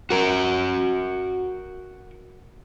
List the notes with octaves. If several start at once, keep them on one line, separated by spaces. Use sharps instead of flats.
F#4 A#4